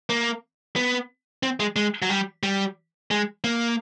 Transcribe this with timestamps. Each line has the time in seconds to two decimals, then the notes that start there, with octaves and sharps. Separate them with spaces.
0.10 A#3
0.76 B3
1.43 C4
1.60 G#3
1.76 G#3
2.02 F#3
2.10 G3
2.43 G3
3.11 G#3
3.44 A#3